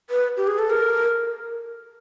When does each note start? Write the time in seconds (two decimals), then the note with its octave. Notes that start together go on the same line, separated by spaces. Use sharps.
0.10 B4
0.37 G4
0.47 G#4
0.59 A4
0.70 A#4